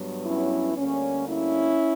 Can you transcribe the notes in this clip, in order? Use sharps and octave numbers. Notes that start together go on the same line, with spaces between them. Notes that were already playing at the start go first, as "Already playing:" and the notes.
Already playing: G2 F#3 B3
C#4 E4
D2 D3 G3 A#3 C#4
C#4 E4